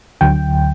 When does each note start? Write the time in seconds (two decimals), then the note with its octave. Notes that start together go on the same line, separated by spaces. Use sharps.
0.21 D2 D3 F#3 G5